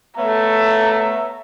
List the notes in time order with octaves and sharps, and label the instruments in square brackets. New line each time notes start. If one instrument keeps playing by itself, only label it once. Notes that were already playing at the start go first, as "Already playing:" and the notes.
[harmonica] A3 [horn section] B3 C#5 E5 [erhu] A#5